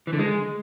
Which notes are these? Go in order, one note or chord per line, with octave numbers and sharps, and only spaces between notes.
E3
D3
G#3